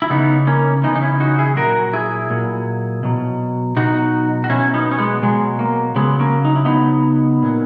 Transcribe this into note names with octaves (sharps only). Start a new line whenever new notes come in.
E4
C#3 E3 B3 D#4
A#3 C#4
C#3 E3 B3 D#4
D#4
C#4 E4
D#4 F#4
E4 G#4
A#2 F#3 F#4 A#4
E4 G#4
A#2 F#3
B2 F#3
B2 F#3 D#4 F#4
F#4
B2 F#3 C#4 E4
B3 D#4
C#4
G#3 B3
B2 F#3 G#3
A#3
C#3 F#3 G#3 B3
A#3 C#4
D#4
E4
C#3 F#3 B3 D#4
A#2 F#3